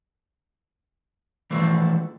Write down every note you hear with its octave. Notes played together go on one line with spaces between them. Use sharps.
E3 F3 A3